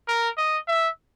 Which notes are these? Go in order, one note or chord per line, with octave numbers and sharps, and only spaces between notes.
A#4
D#5
E5